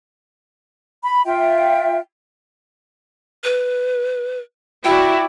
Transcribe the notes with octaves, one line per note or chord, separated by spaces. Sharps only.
B5
F4 E5 G5
B4
E4 F#4 D5 G5